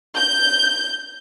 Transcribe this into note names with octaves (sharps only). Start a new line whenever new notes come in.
G6